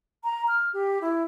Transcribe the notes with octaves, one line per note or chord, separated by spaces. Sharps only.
A#5
F6
G4
E4